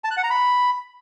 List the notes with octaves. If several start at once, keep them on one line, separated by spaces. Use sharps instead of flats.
A5
F#6
F#5
A#5
B5